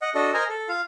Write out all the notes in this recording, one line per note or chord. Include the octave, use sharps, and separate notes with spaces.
D#5 F#5
D4 F#4 A4 D#5
A#4 C5 D#5 G#5 A#5
A4
F4 F5